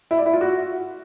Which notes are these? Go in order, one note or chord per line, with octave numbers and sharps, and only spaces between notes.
E4
D5
E4
F4
F#4